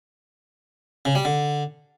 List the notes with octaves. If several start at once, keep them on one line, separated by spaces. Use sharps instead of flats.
C#3
G3
D3